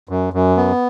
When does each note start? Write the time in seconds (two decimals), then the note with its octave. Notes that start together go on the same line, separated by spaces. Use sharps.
0.09 F#2
0.33 F#2
0.57 B3